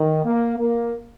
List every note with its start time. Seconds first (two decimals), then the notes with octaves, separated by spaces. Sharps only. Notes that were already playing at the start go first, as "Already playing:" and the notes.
Already playing: D#3
0.25 A#3
0.58 A#3